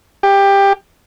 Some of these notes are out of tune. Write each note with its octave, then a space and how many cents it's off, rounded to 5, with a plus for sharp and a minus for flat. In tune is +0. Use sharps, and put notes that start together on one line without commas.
G4 +15